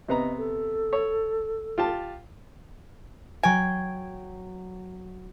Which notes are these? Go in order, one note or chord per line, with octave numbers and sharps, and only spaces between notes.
C3 B3 D#5 A#5
A4
C#5
F4 G4 A5
F#3 G5 G#5